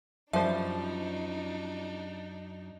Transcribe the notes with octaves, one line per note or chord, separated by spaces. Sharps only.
F#2 F3 G3 D4 D#4 C5 E5